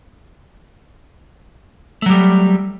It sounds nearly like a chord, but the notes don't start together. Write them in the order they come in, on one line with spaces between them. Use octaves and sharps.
A3 F#3 G3